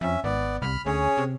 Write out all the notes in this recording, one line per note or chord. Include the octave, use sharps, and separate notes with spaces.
F2 C#4 E5
G#1 B3 D5
C2 B5 F6
D2 C#4 G#4 C#5
C3